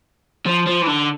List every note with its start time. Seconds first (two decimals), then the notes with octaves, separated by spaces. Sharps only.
0.46 F3
0.67 F3
0.82 E3
0.87 D3